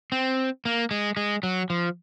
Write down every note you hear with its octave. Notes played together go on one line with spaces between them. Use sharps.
C4
A#3
G#3
G#3
F#3
F3